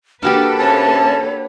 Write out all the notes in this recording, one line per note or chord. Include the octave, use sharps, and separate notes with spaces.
A#3 D4 F#4 G4 A4 B4 F6
C3 C#4 C#5 A5